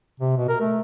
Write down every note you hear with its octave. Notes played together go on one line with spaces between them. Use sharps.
C3
B2
A#4
A3